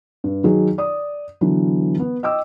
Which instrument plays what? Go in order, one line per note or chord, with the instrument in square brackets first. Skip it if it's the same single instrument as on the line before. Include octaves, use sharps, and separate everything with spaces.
[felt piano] G2
D#3 F#3 G#4
D5 D#6
D3 E3 F#3 B3
B3
D#5 G5 D6 E6